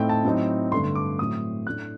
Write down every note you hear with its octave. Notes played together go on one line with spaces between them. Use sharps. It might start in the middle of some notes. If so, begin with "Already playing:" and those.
Already playing: A2 A3 C4 D#4 G5
A5
A2 F#3 C4 D#4
G2 D3 A3 C6
D6
A2 F#3 A3 C4 D#6
A2 A3 D4 F#6